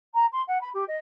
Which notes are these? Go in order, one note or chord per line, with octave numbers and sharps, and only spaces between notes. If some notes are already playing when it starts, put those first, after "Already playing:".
A#5
C6
F#5
B5
G4
D#5